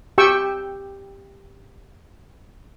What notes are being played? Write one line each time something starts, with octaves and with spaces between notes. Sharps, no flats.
G4 G5 C#6 E6